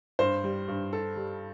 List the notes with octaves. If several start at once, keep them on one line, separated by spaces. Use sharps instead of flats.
G2 C5
G3
G2
A4
G3